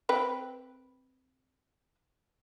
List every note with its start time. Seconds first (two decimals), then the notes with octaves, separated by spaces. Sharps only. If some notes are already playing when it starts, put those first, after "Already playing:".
0.09 C4 B4 G5